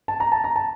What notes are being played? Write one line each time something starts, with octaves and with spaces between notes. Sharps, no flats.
A5
A#5
A5
A#5
A5